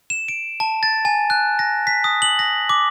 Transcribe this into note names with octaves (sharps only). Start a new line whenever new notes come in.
E7
D7
A5
A6
G#5
F#6
A#6
B6
D#6
F#7
A#6
D6